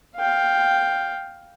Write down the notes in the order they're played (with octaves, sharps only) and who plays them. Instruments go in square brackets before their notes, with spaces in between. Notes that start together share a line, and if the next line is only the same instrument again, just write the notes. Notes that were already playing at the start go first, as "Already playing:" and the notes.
[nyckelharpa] F5 G5